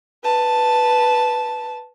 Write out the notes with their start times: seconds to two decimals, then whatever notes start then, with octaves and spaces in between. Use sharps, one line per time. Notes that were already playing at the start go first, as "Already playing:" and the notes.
0.24 B4 A5